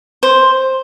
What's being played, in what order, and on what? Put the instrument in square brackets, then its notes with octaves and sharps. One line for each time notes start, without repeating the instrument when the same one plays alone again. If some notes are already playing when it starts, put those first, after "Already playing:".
[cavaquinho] C5